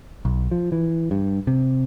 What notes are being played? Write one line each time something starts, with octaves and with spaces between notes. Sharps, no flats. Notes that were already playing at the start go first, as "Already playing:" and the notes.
B1
F3
E3
G2
C3